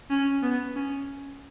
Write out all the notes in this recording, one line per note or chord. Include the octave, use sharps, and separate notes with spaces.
C#4
B3
C#4